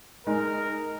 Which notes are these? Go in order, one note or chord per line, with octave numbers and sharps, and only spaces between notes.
G#3 D#4 A#4